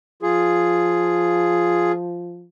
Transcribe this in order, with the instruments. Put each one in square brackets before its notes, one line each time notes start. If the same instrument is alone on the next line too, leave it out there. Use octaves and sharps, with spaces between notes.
[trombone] F3 [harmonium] F4 G#4